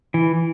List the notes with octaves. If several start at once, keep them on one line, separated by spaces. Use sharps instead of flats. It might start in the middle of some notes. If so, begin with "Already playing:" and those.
E3